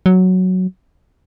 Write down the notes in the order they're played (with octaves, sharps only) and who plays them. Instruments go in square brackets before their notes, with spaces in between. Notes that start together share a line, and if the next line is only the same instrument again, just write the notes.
[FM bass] F#3